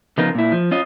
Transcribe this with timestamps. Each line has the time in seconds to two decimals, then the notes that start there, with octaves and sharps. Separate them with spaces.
0.18 C#3 F3 B3 D#4 F4 A#4
0.35 A#2 E4
0.52 F3
0.71 C#4 F4 D#5